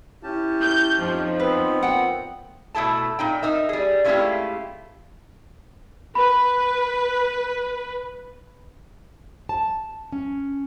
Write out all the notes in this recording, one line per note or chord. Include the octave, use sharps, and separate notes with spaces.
C#4 E4 G4 A5
G6
F2 F3 D#4
B3 C4 B4
A#2 F#5 G5
B2 A3 E4 A4 A5
A#2 D#4 G5
D#4 A#4 E5
G3 G#4
G#3 A3 C#4 E4 F4 G4
B4 B5
A5
C#4